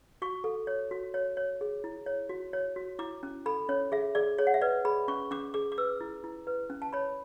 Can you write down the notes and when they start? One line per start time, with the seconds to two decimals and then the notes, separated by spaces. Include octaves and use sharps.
0.22 F#4 C#6
0.44 A4
0.67 C#5
0.91 F#4
1.14 C#5
1.37 C#5
1.61 G#4
1.84 E4
2.06 C#5
2.29 F#4
2.53 C#5
2.76 F#4
2.99 E4 D6
3.23 C#4
3.46 A4 B5
3.69 C#4 C#5
3.92 G#4 E5
4.15 G#4 D5
4.38 G#4 C#5
4.47 F#5
4.54 E5
4.61 B4 D5
4.85 G#4 B5
5.08 C#4 C#6
5.31 C#4 D6
5.54 G#4 D6
5.72 D6
5.78 B4 E6
6.01 E4
6.24 E4
6.47 B4
6.70 C#4
6.82 A5
6.93 C#5 B5